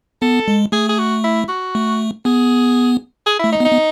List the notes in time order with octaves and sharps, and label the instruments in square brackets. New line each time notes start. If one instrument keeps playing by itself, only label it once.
[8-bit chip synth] B3 [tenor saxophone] A4
[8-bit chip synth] G#3
[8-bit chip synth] A3 [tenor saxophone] G#4
[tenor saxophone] G#4
F#4
E4
F#4
[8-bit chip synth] A3
[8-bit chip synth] B3 [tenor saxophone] G#4
[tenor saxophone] G#4
E4
[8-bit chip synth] A3
[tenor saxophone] D#4
[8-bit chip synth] B3
[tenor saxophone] D#4
[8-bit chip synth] B3